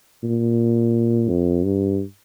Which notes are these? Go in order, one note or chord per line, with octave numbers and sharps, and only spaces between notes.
A#2
F2
G2